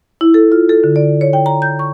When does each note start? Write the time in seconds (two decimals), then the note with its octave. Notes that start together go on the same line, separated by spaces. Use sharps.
0.21 E4
0.34 A4
0.52 F4
0.69 A4
0.84 D3
0.96 D5
1.21 C#5
1.33 G5
1.46 A#5
1.62 G6
1.79 C#6